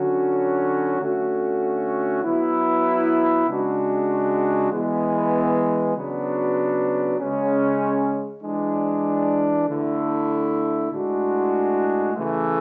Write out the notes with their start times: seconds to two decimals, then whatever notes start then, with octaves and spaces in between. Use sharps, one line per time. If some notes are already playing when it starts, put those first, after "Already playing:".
Already playing: D3 F#3 C#4 F#4
0.99 D3 A3 C#4 F#4
2.23 F#3 B3 E4
3.47 C#3 G#3 D4 F#4
4.71 E3 G#3 B3
5.95 C#3 F#3 B3 D4 F#4
7.18 C#3 G#3 C#4
8.43 E3 G#3 D4
9.67 D3 A3 E4
10.91 A2 G#3 D4 F#4
12.15 C#3 E3 A3